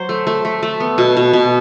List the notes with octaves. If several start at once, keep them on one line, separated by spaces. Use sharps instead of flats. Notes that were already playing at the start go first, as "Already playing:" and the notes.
Already playing: F#3 C5
A3
A3
A3
A3
B3
B2
B2
B2